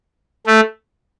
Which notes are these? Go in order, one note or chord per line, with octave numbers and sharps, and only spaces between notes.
A3